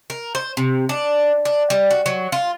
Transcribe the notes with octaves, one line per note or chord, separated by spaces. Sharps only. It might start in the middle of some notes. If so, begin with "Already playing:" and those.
A#4
C5
C3
D4
D4
G3
F#4
F#3
F4